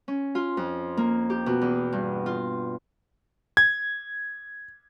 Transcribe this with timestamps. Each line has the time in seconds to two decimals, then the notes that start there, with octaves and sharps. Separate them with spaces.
0.08 C#4
0.35 F4
0.57 F2
0.97 A#3
1.30 G4
1.46 B2
1.61 E2
1.93 G2
2.26 F4
3.57 G#6